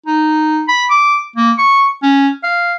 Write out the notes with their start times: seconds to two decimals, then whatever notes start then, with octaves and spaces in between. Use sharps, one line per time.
0.06 D#4
0.68 B5
0.90 D6
1.36 A#3
1.58 C#6
2.03 C#4
2.44 F5